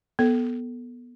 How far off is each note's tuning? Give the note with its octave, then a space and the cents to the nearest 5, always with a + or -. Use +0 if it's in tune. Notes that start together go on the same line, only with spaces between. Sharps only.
B3 -20 A4 +0